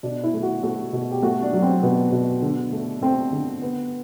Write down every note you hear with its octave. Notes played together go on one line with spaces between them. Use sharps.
B2 D4
E4
A3
F#4
A3 F#4
B2
G4
A3 F#4
D4
F#3
C4
B2 B3
B2
D3
A3
A3 C4
D3
B3